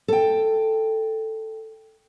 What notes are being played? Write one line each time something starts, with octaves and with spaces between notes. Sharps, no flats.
A4 G5